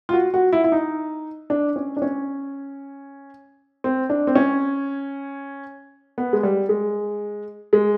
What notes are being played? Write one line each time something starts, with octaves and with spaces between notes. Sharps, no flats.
F4
F#4
F#4
E4
E4
D#4
D4
C#4
D4
C#4
C4
D4
C4
C#4
B3
G#3
G3
G#3
G#3